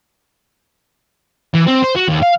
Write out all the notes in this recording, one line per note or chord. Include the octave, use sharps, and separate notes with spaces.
E3
C4
C5
F#4
D#2
F5